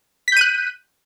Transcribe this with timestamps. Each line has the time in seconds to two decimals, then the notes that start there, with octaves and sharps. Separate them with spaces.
0.28 B6
0.32 G6
0.37 D#7
0.41 F#6